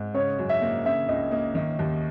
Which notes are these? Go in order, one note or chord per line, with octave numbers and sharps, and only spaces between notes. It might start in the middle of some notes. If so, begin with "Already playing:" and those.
Already playing: G#2
C#3 C#5
F#2
E5
A#3
C#3 E5
C#2 D#5
A#3 D#5
D#3
D#2